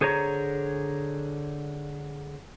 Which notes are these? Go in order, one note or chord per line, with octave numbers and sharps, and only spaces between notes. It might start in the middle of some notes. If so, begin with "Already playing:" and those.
D3 G#4 C5 C#5 A#5